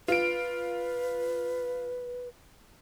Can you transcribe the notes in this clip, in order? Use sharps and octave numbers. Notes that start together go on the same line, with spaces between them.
F4 B4 D7